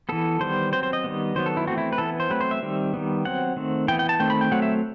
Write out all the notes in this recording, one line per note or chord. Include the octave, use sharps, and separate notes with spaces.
E3 B3 A4
D#3 G3 B3 C5
F#3 C4 C5
C5
D#5
D#3 G3 B3
D#3 F#3 B3 C5
A4
E4
E3 A3 C4 F#4
E4
B4
E3 B3 A4
C5
F#3 A3 C4 B4
C5
E5
D#3 G3 C4
D#3 G3 B3
F#3 C4 F#5
D#3 A3 C4
E3 B3 G5
G5
A5
D#3 A3 C4 G5
B5
G5
F#3 A3 C4 F#5
E5